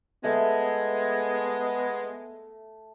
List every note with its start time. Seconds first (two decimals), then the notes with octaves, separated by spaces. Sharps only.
0.24 G#3 A3 B3 E5